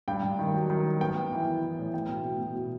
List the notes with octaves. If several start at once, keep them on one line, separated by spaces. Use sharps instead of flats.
G2 G5
G2
D#3
F#3
D#3
F#3
B3 G5
B3
E3
E3
E3
A2
B3 G5
B2
B2
B2
B2